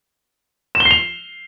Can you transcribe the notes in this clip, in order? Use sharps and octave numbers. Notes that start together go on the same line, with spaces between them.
E7
G7
C7
F7